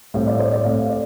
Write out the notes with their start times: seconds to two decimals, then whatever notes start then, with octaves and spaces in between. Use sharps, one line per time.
0.14 A2 G3 C4 F5
0.27 D5
0.39 C5
0.52 D5
0.64 A2 A3 C4 F5
0.89 D5